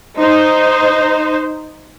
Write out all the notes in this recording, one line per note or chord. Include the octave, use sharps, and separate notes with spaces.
D#4 C5